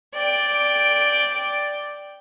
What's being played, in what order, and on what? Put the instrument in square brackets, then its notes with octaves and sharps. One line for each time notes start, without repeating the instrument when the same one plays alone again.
[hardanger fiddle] D5 G5